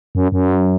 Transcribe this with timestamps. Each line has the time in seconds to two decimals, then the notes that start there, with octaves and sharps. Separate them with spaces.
0.15 F#2
0.32 F#2